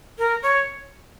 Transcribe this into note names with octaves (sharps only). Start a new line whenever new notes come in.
A#4
C#5